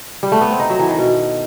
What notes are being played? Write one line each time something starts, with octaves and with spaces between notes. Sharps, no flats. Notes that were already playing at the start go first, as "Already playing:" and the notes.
G3
A3
B3
C4
D#4
F#3
E3
D#3
B2